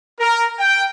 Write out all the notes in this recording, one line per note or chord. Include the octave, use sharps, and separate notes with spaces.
A#4
G5